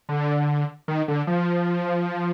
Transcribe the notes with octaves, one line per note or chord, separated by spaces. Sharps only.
D3
D#3
D3
F3